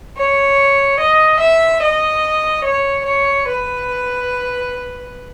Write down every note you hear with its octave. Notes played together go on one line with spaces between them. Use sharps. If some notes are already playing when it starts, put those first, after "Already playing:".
C#5
D#5
E5
D#5
C#5
C#5
B4